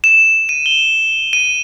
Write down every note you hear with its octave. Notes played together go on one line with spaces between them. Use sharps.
E7
D#7
G7
D#7